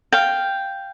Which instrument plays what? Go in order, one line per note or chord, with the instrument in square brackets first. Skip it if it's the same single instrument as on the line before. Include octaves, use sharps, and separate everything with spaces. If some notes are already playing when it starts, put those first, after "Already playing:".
[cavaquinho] F5 G5